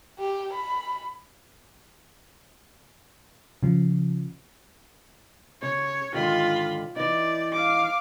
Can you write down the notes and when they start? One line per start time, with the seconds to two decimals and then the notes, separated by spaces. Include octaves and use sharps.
0.19 G4
0.53 B5
3.63 C#3 F3
5.62 C#3 C#5
6.14 G#2 D3 D#3 F4 B5
6.96 E3 D#4 D5
7.53 F5 D6